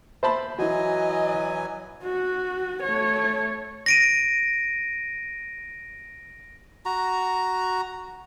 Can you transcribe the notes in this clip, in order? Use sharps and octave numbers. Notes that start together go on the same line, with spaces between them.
C5 E5 A5 B5
E3 F#3 E4 F#4 D#5 G#5
F#4
A3 C#5
A#6 D7 D#7
F#4 A#5